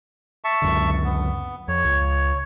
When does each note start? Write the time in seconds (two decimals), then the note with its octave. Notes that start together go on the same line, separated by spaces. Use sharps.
0.44 E5 A5 C#6
0.62 C#2 F#2 D3
1.05 B3
1.68 F2 C#5
1.85 C#2